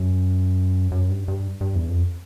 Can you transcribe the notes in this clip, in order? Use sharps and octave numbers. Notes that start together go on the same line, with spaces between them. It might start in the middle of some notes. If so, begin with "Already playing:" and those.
Already playing: F#2
F#2
G2
G2
G2
E2
F2